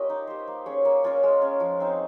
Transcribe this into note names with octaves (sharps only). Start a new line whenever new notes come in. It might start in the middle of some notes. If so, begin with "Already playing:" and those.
Already playing: A#3 C#4 F4 G4 A#4 D#5
D#4
G4 C5
A#3
C#4 G#4 C#5
A#3
C#4 F4 A#4
G#3
C#4 G#4
F3
C4 D#4